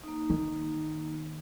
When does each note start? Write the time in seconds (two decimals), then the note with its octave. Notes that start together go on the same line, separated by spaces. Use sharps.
0.04 A#3 D#4
0.30 D#3